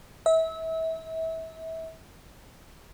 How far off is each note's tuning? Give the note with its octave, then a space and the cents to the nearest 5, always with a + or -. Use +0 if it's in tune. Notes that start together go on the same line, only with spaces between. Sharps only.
E5 -30